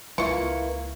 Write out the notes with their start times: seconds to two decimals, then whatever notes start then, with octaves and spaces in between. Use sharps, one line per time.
0.18 C#2 A#3 E4 F4 B4 C#6